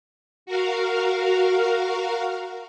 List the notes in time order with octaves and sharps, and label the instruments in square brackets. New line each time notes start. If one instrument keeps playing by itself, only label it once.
[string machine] F#4 A#4 F5